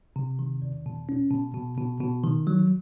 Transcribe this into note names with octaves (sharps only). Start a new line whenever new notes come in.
C3
D#3
E2
B2
C#4
B2
B2
B2
B2
D#3
F#3